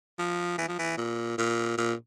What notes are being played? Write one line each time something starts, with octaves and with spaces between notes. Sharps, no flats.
F3
E3
F3
E3
A#2
A#2
A#2